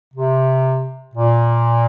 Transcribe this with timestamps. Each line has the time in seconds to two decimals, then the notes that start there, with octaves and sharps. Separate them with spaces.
0.14 C3
1.14 A#2